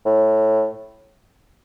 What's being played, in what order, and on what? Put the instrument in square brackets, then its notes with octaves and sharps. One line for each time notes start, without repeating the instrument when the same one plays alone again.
[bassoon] A2